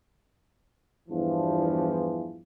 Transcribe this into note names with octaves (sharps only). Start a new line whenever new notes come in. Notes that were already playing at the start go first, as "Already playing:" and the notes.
E2 G2 E3 F3